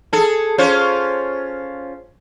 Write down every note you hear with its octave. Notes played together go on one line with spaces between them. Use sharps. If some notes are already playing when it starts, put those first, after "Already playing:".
G#4 A4
C#4 F4 C5